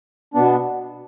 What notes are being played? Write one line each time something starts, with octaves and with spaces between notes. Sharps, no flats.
B2 B3 D4